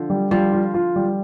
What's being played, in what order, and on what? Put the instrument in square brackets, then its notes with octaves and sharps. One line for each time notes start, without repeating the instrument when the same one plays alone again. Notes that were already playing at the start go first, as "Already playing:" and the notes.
Already playing: [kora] D3 F3
[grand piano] G3
[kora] F3 [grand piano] G3
[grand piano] F4
F4
G3